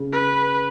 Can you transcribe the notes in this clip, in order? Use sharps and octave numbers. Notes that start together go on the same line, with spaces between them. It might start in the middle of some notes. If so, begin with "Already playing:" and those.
Already playing: C#3
B4